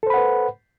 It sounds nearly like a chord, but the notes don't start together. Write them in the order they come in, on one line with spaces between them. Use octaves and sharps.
A4 C5 B5 F#5 B4